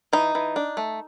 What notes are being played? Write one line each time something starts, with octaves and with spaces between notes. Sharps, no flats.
E3 D#4
E3
D4
A3